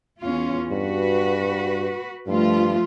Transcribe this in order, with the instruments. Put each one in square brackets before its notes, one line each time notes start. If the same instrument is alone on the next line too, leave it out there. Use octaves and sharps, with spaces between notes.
[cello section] E2 C#4 F4
[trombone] G2 [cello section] F#4 B4
[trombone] G2 [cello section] F3 A3 F4